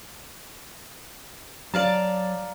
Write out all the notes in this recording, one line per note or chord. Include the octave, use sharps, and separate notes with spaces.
F#3 D5 F5 A5 A#5